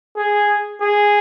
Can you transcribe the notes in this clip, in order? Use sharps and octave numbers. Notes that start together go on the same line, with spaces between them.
G#4
G#4